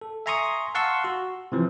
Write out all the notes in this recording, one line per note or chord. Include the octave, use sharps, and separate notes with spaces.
A4
E5 G#5 A#5 C6 C#6 D#6
F5 F#5 A5 C6 C#6 E6
F#4
C3 E3 F3